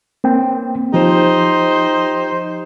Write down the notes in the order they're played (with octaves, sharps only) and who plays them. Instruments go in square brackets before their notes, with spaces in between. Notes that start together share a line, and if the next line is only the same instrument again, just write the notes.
[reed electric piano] A#3 C4 G5
[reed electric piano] F3 [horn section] D#4 G4 C5